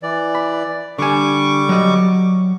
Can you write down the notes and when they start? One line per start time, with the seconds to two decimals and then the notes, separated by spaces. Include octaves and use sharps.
0.03 E3 D5
0.35 B5
0.98 D3 G3 G#5 C#6 D6
1.69 F#3 D#5